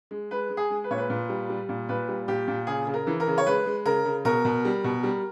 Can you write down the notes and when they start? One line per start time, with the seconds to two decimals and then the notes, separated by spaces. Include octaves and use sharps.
0.11 G#3
0.31 G#3 B4
0.50 G#3
0.57 G#4
0.70 G#3
0.84 B4
0.91 A#2 C#5
0.98 B4
1.10 A#2
1.29 G3
1.49 G3
1.69 A#2
1.89 A#2 B4
2.08 G3
2.28 A#2 G4
2.48 A#2
2.67 C#3 G#4
2.87 C#3
2.94 A#4
3.07 E3
3.20 A#4
3.27 C#3
3.38 C#5
3.46 G#3 B4
3.66 G#3
3.85 C#3 A#4
4.05 C#3
4.25 B2 A#4
4.45 B2
4.65 G3
4.84 B2
5.03 G3